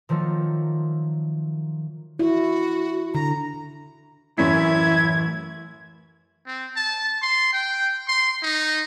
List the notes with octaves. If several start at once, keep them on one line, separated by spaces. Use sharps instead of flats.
D#3 F3 F#3 A3 A#3
E4 F#4
D3 A#5
F#2 A2 E3 C#4 E4 G#6 B6
C4
A5
C6
G5
C6
D#4